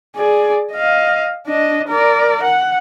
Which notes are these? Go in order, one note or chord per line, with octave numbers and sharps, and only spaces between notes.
G#4 D5
D#5 F5
D4 D#5
A#4 D5
F#5